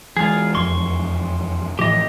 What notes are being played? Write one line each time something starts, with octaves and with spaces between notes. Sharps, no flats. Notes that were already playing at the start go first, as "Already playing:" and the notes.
E3 G#3 F4 G#4
E1 F2 C6 C#6
A2 E3 F3 G4 D#5